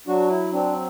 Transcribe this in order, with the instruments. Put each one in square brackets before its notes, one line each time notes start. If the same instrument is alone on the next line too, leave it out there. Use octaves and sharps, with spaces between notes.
[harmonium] F#3 D4 F#4
E4
C4 D4